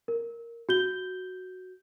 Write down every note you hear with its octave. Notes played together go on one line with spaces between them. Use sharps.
A#4
F#4 G6 G7